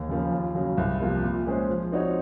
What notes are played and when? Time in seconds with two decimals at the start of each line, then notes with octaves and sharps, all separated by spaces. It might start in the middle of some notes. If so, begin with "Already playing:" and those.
Already playing: D#2
0.09 C#3 F3 A#3
0.32 D#2
0.55 C#3 F#3
0.77 C2
1.00 C3 F3 A#3 F4
1.23 A#2
1.47 G#3 C#4 G#4 C5
1.69 F3
1.92 C4 D#4 F#4 C#5